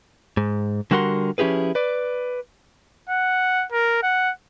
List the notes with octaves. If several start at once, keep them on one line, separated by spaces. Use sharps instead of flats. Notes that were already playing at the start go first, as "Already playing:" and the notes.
G#2
D3 G3 F#4 A#4 F#5 C6
F3 C#4 E4 G4 G#4 B4
B4 D5
F#5
A#4
F#5